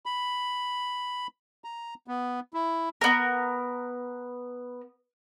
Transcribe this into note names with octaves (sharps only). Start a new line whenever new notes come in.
B5
A#5
B3
E4
B3 A#4